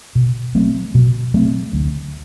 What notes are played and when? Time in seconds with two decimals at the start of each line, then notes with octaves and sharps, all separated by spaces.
0.15 B2
0.55 F#3 A3 C4
0.95 B2
1.34 F#3 A3 C4
1.73 D2